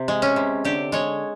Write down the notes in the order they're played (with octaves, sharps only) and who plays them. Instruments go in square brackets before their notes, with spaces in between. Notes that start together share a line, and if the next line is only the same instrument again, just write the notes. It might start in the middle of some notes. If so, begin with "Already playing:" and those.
Already playing: [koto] C3
G#3
C#4
C3
D3 G4
G#3 C#5